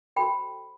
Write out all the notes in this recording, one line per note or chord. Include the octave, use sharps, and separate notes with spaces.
F#4 A4 C5 G5 B5